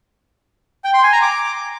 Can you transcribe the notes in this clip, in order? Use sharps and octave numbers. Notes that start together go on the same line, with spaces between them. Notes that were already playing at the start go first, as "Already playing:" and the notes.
G5
C6
G#5
A#5
D6